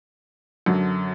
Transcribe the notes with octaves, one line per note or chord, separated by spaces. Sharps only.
F#2 D3 F#3